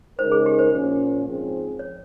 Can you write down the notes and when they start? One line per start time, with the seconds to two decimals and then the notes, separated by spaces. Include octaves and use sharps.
0.19 C#3 G#3 D#4 A#4 C5
0.32 G#4
0.46 G4
0.59 C5
0.72 A#2 F3 A#3 C#4
1.25 G#2 F3 G#3 C4
1.79 C#5